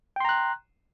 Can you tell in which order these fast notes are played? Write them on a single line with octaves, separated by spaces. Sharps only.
G5 C6 A#5 F#6